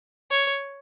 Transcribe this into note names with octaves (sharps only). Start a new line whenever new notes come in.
C#5